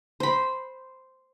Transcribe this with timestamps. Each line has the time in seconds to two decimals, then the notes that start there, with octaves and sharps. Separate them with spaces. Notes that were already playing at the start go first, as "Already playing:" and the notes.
0.20 C5 B5